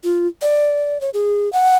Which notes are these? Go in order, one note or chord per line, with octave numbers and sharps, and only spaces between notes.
F4
D5
C#5
G#4
F#5